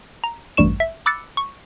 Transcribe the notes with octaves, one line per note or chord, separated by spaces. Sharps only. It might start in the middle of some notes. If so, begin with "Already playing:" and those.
A#5
A1 D2 G2 G3 C#6 E7
E5
B5 D6 E6 F#6 A6 C#7
C#6